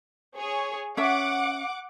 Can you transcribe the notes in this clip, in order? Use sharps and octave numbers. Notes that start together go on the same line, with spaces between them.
G#4 C#5
C#4 E5 F#5 D6